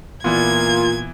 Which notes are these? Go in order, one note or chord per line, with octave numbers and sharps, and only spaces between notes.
A#2 E3 B3 F4 G#6